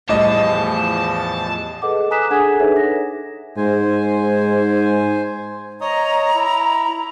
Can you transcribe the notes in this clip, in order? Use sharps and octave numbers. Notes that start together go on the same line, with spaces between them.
E2 A2 F3 G3 D#5 A5 D6
G#4 A4 B4 D#5 F#5 D6
G#5 A#5 D#6 F#6 B6 E7
D4 G#4 A4 F#5 G#5 G#6
D#4 G#4 A4 B4 C#5 E5
A#6
G#2 C5 G#5
C#5 D#5 A#5 D#6
E4